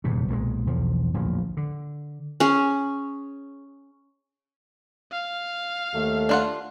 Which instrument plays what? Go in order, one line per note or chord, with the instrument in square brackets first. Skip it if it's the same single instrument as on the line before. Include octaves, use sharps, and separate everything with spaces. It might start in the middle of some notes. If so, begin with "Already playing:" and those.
[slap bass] D#1 E2 G#2 C3
B1 A#2 F#3 G#3
B1 E2 F3
D1 A#1 E2 F3
D3
[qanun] C#4 G#4
[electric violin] F5
[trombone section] D#2 A3
[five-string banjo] D4 F4 F#5